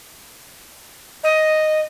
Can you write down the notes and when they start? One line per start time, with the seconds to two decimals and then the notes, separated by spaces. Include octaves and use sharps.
1.24 D#5